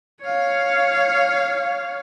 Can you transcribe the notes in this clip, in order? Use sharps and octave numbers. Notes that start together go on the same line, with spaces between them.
C#5 F5